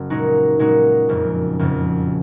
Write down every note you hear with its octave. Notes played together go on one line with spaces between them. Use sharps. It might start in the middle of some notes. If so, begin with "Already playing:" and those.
Already playing: F#1
A#2 G#3 D#4 F#4
A#2 G#3 D#4 F#4
F#1 F2 C#3
F#1 F2 C#3